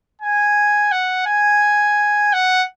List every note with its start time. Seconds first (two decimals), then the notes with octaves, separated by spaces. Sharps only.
0.22 G#5
0.92 F#5
1.27 G#5
2.33 F#5